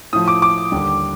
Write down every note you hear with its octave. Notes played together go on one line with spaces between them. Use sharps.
A2 F3 D#6
D6
D6
D#2 D3 G3